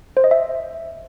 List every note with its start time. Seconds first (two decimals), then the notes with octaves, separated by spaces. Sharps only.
0.17 C5
0.24 D#5
0.31 E5